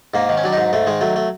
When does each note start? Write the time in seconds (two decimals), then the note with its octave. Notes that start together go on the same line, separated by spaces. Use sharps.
0.14 G#2 A#3
0.29 D#3
0.37 C#4
0.44 F#3 D4
0.52 G#2 D#4
0.73 G#2 A3
0.86 D#3 G#3
1.01 F#3 A3
1.16 A3